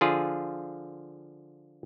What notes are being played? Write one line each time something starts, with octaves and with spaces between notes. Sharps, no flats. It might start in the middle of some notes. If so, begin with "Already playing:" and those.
D3 F3 F4 G#4